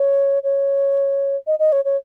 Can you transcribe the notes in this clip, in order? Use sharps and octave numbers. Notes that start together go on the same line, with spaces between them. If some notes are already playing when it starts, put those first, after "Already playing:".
Already playing: C#5
C#5
D#5
D#5
C#5
C#5